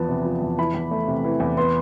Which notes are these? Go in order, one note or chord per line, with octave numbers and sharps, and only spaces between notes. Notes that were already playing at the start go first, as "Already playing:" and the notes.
Already playing: E2 F3 B3 A5
C3
F3
E2
E3 B5
E2
A3
C3
E3
E2
B3 C6